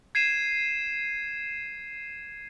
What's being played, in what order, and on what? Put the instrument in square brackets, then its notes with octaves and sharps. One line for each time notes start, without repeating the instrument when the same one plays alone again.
[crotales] G#6 C7 D#7 E7